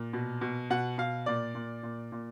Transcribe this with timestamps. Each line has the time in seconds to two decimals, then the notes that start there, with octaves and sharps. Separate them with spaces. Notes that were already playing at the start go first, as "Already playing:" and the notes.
Already playing: A#2
0.13 B2
0.41 B2
0.70 B2 F#5
0.98 B2 F5
1.26 A#2 D5
1.55 A#2
1.83 A#2
2.12 A#2